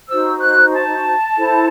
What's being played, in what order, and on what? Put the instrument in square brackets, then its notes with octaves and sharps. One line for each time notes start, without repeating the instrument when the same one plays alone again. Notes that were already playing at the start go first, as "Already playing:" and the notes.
[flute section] D#4 F#4 C5 E6
F#6
A5
E4 A4 C5